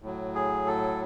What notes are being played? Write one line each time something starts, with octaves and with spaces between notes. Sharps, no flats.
A2 F#3
G#4
A4